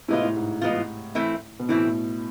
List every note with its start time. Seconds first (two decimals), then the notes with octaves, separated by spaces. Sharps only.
0.08 A2 C3 E3 G#3 B3 F4
0.22 A2
0.36 G#2
0.61 E3 G#3 B3 F4
1.15 E3 A3 C4 E4
1.60 B2
1.69 A2 E3 A3 C4 E4